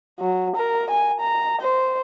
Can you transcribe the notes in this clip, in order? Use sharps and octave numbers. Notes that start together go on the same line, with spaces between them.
F#3
A#4
G#5
A#5
C5